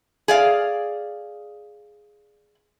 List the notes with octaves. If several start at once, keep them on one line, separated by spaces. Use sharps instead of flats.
G#4 D5 F5